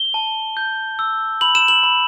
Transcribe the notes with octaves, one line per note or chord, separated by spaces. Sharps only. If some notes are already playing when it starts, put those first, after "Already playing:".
Already playing: G7
A5
G6
E6
B5 F#7
E7
F#7
B5